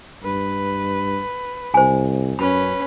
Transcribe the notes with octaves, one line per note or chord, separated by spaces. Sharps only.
G2 B4
C2 C5 G#5
F#2 C#4 B4 B5